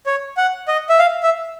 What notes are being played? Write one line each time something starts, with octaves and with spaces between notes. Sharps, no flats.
C#5
F#5
D#5
E5
F5
E5